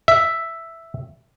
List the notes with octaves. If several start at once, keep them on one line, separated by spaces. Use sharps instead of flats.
E5